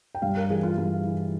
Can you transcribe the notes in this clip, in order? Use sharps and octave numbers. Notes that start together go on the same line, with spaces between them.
G5
G2 F5
A#4
E3 G#4
F4
G2 F4
E3